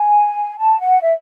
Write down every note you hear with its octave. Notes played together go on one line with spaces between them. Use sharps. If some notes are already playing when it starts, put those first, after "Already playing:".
Already playing: G#5
A5
F#5
E5